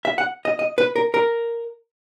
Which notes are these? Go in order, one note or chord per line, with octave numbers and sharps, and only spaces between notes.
E5
F#5
D#5
D#5
B4
A#4
A#4